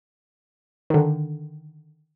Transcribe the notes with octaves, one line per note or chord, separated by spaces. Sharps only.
D3 D#3